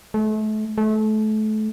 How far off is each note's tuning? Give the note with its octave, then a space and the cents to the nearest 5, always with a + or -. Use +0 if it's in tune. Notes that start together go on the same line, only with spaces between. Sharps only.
A3 -35
A3 -30